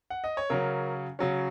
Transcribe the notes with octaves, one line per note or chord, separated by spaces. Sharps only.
F#5
D#5
C#5
C#3 F#3 C#4 A#4
C#3 F#3 C#4